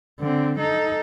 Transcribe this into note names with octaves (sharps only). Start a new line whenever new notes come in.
D3 C4
D#4 A4